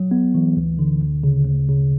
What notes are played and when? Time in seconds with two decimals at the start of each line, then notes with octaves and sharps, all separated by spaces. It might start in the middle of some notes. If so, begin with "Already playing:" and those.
Already playing: F#3
0.11 B3
0.34 E3
0.57 D2
0.79 D3
1.02 D2
1.24 C#3
1.45 D2
1.69 C#3